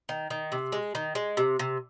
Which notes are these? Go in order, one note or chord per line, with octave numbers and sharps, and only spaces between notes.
D#3
D#3
C3
G#3
D#3
G#3
C3
C3